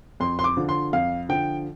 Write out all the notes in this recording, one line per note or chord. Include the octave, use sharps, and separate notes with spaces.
F2 C6
C6
D6
D3 F3
C6
F2 F5
D3 F3 G5